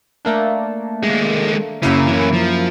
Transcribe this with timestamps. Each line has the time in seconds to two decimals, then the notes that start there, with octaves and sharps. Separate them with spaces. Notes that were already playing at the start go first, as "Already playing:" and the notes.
0.25 A3 A#3 D4
1.03 D#2 G#3
1.83 F#2 C#3 A#3 E4
2.07 E3 C#4
2.34 F3